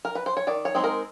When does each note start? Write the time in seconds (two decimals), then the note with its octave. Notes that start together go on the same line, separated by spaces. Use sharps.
0.05 A#4
0.15 B4
0.26 C5
0.37 C#5
0.47 D#3 D5
0.65 C#5
0.75 G#3 C4 D#4
0.84 A#4